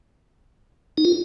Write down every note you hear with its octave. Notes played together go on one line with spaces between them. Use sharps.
D#4
F4